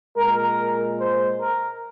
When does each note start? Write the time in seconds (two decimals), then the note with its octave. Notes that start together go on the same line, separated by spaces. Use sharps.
0.17 A#2 G#3 A#4
1.00 C5
1.40 A#4